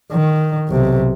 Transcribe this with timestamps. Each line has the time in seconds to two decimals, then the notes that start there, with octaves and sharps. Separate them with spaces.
0.12 D#3
0.68 B1 C3